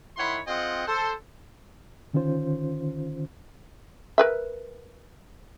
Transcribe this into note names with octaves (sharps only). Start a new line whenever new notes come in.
D#3 E4 C#5 F#5 B5 C6
C4 F4 G#4 D#5 F#5 G5
A4 C5
D3 D#3 C#4 F4 C5
A#4 B4 E5